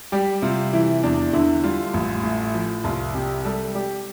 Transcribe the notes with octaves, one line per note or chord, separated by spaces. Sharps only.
G3 G4
C3 F4
E3 E4
E2 D4
D3 E4
G3 F4
A1
A2
F3
C2 F4
C3 G4
G3 A4
G3 G4